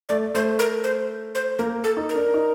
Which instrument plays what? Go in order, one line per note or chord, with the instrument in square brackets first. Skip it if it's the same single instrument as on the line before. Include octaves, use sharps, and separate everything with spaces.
[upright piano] A3 [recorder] D5
[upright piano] A3 [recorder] C5
[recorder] A#4
C5
C5
[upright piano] A#3 [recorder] A#4
[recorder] A4
[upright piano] D#4
[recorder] A#4
[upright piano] D4
D#4